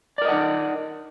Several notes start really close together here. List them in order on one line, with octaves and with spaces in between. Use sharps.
D5 A#4 D#5 F#5 D#4